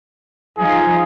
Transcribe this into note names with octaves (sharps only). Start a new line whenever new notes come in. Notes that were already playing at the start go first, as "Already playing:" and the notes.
F3 D#4 F4 G#4